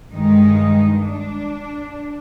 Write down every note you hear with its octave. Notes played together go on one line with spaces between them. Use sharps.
G2 D#3 G#3 D#4
D4